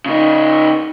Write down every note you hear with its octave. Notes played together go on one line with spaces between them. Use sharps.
C#3 D#4